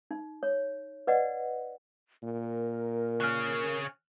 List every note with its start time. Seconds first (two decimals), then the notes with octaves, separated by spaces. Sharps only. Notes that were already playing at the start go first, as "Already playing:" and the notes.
0.11 D#4
0.43 C#5
1.07 B4 D5 D#5 F#5
2.23 A#2 A#4
3.20 C#3 C#4 F6 F#6